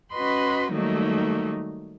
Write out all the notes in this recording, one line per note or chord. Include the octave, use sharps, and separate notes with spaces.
C#4 F#4 B4 D#5 B5 C6
D#3 F#3 G3 A3 A#3 D#4